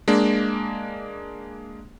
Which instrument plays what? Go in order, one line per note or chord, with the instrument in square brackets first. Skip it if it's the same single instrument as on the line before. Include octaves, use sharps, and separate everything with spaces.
[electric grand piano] G#3 A#3 D4